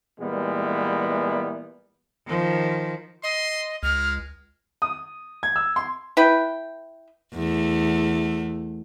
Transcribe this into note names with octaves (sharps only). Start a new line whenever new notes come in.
A#2 E3 G3 G#3 B3
D#3 F3
D#5 C6
C#2 G#3 F6
D#6
G#6
E6
C6
E4 B4 G5
E2 A3